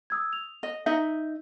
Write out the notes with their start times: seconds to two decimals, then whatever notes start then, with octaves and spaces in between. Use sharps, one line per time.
0.10 D#6 E6 G#6
0.33 F7
0.63 D#5
0.86 D#4 D#5 E5 G6